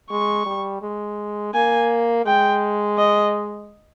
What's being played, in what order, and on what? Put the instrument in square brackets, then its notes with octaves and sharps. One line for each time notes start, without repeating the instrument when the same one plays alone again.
[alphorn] G#3 [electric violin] C#6
[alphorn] G3
G#3
[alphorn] A#3 [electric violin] G#5
[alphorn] G#3 [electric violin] G5
[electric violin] D#5